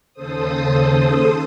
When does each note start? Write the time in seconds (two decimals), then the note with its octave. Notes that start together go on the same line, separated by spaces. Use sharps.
0.13 D#2 C#3 A4 C5 D#6